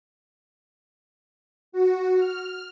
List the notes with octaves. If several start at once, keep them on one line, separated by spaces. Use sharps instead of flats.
F#4
F6